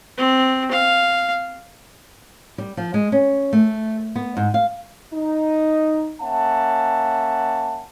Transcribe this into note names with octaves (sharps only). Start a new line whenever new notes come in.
C4
F5
G3
F3
G#3
C#4
A3
B3
G#2
F5
D#4
A#3 C#4 E5 F#5 A5